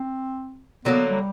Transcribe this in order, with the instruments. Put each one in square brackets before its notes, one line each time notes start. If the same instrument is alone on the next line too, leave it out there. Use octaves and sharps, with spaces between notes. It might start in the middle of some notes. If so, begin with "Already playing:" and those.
Already playing: [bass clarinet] C4
[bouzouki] D3 F#3 A#3 [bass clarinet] B3
[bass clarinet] G3